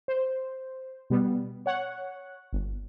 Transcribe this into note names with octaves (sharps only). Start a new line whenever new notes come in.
C5
B2 G3 B3
C#5 F#5
G1